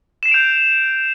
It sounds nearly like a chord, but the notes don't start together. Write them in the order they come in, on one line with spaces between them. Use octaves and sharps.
E7 C7 F7 D7 G6